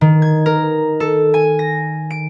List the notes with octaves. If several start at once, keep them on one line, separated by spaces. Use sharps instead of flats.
D#3
G#6
A#4
A4
G#5
A#6
D7